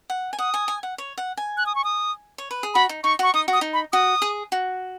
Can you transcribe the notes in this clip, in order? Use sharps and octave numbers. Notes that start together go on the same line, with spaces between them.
F#5
G#5
F#5 D#6
G#5
G#5
F#5
C#5
F#5
G#5
F#6
D#6
C#6
D#6
C#5
B4
G#4
F#4 B5
D#4
D#4 C#6
F#4 C#6
D#4 D#6
F#4
D#6
D#4
B5
F#4 D#6
G#4
F#4